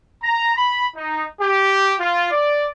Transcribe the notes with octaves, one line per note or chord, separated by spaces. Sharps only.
A#5
B5
D#4
G4
F4
D5